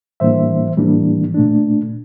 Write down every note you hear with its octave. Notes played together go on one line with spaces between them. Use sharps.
A2 E3 G3 A#3 D4 C5 E5
A2 E3 G3 A#3 D4
A#2 A3 D4